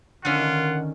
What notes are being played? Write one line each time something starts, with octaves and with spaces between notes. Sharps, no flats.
D3 D#3 C#4 F4 F#5